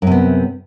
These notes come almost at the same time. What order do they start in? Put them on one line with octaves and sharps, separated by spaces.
F#2 C3 B3